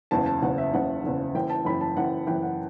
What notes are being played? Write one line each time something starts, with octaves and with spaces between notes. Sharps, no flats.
F#1 E2 C#3 A5
A5
F#1 E2 C#3 F#5
E5
F#1 E2 C#3 F#5
F#1 E2 C#3
F#1 F#2 E3 G5
A5
F#1 F#2 E3 B5
A5
F#1 F#2 E3 F#5
F#1 F#2 E3 G5
F#5